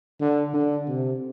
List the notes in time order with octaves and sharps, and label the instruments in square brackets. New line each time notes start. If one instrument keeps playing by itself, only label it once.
[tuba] D3
D3
C3